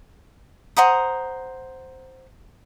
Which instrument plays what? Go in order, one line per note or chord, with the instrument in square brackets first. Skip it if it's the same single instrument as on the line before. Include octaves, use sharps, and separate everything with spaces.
[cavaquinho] C5 F#5 A#5 D#6